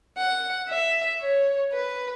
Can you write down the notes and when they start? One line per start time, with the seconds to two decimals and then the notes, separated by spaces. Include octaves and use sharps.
0.18 F#5
0.69 E5
1.21 C#5
1.73 B4